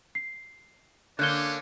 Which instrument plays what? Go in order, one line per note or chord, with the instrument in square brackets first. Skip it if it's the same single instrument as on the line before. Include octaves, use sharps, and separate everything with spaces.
[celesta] C7
[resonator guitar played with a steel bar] D3 A#3 [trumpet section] C#4 D4 C#5 [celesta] F#6 G6 G7